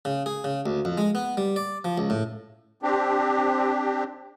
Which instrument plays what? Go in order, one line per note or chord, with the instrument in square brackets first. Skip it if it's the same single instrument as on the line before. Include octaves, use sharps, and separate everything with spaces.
[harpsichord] C#3
G#4
C#3
D2
F2
G#3
B3
G3
D5
F3
C#2
A2
[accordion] C4 D4 G4